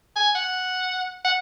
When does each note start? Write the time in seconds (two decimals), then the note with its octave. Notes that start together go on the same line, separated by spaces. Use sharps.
0.16 G#5
0.35 F#5
1.25 F#5